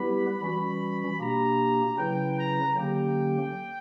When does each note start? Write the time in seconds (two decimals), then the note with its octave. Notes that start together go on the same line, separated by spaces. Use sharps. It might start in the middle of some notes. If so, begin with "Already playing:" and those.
Already playing: G3 B3 E4 G4 B4 B5
0.41 E3 G3 C#4 F#4 B5
1.19 B2 A#3 D4 G4 A#5
1.97 C#3 F#3 C#4 E4 B4 G5
2.36 A#5
2.75 D3 F#3 A#3 C#4 G4 G5